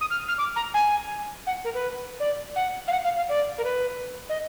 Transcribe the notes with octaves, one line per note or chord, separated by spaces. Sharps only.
D#6
F6
F6
D6
A#5
G#5
F#5
A#4
B4
D5
F#5
F5
F#5
F5
F5
D5
A#4
B4
D#5